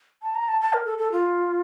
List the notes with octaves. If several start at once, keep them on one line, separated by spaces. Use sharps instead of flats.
A5
A#5
A5
A5
A#4
A4
A4
F4